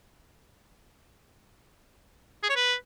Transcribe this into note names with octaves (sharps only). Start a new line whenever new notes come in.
G#4
C#5
B4